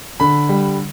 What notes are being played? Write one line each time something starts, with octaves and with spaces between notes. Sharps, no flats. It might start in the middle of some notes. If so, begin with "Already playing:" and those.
D3 B5
G3